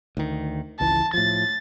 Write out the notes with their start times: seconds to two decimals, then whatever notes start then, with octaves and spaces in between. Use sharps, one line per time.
0.17 D2 D#3
0.80 G#1 C#2 E3 A5
1.14 A2 F3 A6